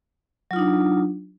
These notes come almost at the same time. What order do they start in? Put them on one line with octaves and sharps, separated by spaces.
F#3 F4 D#4 D4